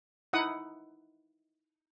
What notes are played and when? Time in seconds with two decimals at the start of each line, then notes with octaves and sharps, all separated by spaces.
0.33 D#4 E4 F#5 D#6